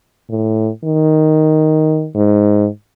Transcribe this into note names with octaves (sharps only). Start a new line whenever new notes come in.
A2
D#3
G#2